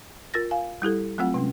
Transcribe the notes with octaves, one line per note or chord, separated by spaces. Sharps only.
F4 A#4 A6 A#6
F5 G#5
G3 E4 G4 A4
F#3 A3 C4 F4 F#5
C3 G#3 C#4